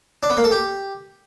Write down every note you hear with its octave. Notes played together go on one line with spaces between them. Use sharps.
D4
B3
A#3
A4
G4